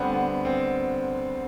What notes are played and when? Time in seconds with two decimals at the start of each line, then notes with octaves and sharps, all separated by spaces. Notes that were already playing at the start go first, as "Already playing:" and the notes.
Already playing: D2 D3 G3 B3 C4 D4
0.14 B3
0.45 C4